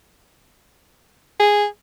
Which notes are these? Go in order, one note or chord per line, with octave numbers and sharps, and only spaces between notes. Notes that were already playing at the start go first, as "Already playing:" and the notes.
G#4